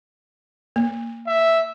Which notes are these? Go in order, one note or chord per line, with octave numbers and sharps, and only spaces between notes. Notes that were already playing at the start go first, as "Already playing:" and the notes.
A#3
E5